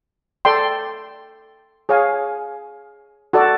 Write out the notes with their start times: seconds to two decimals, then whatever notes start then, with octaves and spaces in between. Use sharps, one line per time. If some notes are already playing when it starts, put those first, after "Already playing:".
0.45 A4 D5 G5 C6
1.89 G#4 C#5 F5 G#5
3.33 F#4 A4 D5